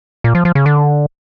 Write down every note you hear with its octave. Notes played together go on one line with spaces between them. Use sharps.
A#2
F3
F3
C#3
D3